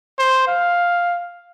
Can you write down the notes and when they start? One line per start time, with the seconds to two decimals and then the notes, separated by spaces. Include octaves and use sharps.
0.19 C5
0.48 F5